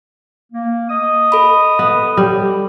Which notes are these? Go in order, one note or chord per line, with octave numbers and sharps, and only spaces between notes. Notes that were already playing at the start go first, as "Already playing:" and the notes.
A#3
D#5 D#6
A4 B5
B3
G3